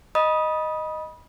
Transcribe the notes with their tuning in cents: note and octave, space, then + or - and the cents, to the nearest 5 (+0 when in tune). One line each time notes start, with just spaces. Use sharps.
D#5 +0 B5 -25 D#6 +5